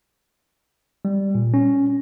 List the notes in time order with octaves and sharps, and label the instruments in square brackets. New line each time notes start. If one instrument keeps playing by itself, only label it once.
[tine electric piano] G3
A#2
C#4